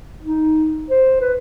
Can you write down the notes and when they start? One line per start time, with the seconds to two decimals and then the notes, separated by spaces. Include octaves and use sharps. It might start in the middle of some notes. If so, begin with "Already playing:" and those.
0.22 D#4
0.90 C5
1.21 B4